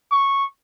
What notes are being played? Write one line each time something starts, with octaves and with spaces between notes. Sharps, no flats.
C#6